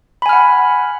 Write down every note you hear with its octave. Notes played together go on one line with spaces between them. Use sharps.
F#5 G#5 B5 F6